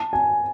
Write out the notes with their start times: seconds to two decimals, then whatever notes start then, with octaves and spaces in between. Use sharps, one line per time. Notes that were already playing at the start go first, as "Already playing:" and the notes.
Already playing: A5
0.13 G#5